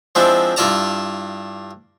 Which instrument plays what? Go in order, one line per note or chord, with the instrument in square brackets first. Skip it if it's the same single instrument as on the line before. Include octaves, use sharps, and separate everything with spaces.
[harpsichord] F3 G#3 C4 D4 E4
G2 E4 F4 D5 A5 A#5